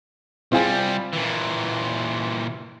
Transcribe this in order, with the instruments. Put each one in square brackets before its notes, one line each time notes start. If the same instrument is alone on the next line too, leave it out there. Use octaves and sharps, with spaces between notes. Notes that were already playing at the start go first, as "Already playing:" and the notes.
[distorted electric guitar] C2 G3 [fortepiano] C4 F4 G#4
[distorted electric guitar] A#2 E3